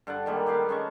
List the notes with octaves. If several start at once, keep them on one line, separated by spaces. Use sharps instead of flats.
G2 D3 F#5 A5
D#3 G3 G#3 A#3
D#3 G4 B4 F5
G#3 C#4 A5 C#6